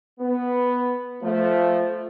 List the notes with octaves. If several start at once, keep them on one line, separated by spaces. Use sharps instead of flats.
B3
F3 A3